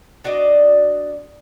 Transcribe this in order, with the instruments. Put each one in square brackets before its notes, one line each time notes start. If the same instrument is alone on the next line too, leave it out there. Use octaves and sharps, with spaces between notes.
[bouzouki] D4 F#4 D5 D#5